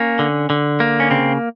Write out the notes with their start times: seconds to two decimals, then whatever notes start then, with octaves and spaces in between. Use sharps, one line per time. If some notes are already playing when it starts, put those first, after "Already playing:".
Already playing: A#3 C#4
0.19 D3
0.50 D3
0.80 A#3
1.00 C#4
1.10 C#3 C4